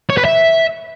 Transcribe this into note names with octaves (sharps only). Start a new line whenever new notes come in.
C#5
B4
E5